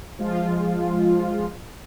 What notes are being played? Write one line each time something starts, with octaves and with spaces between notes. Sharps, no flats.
F3 G#3 F4